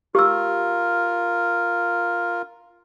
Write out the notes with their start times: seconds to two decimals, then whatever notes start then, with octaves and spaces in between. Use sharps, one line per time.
0.15 F4 G4 A#4 E6